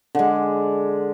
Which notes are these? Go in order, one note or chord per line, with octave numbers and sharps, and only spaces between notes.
D3 G#3